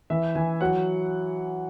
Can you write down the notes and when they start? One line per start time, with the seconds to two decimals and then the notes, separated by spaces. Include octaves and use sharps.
0.10 E3 E5
0.35 E3 G#5
0.61 F#3 F#5